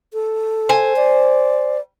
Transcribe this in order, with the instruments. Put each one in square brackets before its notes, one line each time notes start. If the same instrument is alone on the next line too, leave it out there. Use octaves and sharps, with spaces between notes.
[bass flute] A4
[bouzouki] C5 G#5
[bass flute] D5